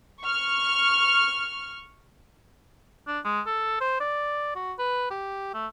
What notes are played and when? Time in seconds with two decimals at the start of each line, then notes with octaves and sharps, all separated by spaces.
0.23 C#6 F6
3.07 D4
3.25 G#3
3.46 A4
3.81 C5
4.00 D5
4.55 F#4
4.79 B4
5.10 G4
5.54 A3